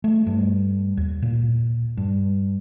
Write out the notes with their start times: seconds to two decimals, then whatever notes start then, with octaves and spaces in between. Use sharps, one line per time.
0.04 A3
0.27 G2
0.97 D#2
1.22 A#2
1.97 G2